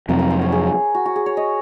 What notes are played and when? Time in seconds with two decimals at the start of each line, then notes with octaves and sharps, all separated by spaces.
0.09 F2 C3 F#3 C4 A#4
0.19 A#4
0.30 C5
0.42 C#5
0.52 G#4
0.95 F#4
1.06 F#4
1.16 G#4
1.26 C#5
1.37 D#5